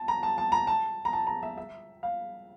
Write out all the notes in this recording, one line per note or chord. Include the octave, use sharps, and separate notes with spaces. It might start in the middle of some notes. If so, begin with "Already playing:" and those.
Already playing: A5
A#5
A5
A5
A#5
A5
A#5
A5
A#5
E5
E5
F5